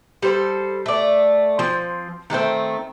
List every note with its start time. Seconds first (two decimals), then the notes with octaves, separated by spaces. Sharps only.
0.22 G3 A4 C5
0.86 A3 D5
1.59 F3 C4
2.30 D#3 G#3 A3 C4